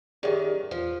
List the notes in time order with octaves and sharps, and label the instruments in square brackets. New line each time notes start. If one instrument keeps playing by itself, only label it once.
[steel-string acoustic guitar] F#2 D#3 [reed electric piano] G4 G#4 D5
[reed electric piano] E2 [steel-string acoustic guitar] F3